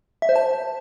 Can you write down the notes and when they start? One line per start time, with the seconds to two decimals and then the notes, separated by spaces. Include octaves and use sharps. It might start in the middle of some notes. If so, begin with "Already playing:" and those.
0.22 E5
0.29 C5
0.36 A5